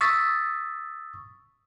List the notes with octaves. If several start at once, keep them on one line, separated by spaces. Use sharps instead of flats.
C#6 D#6 E6 A6 B6